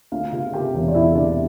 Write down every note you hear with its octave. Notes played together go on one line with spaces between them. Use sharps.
D2 F4 F5
C3 F4 F5
C3 G4 G5
E1
D5
E1 E4 E5
C3 D4 D5